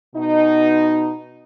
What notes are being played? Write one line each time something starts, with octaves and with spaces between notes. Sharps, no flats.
B2 D#4